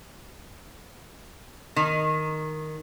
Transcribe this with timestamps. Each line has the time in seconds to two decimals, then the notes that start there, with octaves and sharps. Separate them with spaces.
1.76 D#3